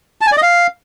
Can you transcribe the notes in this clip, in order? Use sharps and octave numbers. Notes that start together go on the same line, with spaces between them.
A5
G#5
D5
D#5
F5